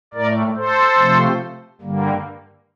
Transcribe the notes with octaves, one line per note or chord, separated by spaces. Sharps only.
A2 A3 A#4 D5
A4 C5
C3 F3 A3
G2 D3 G3 A#3